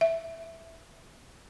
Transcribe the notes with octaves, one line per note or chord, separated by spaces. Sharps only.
E5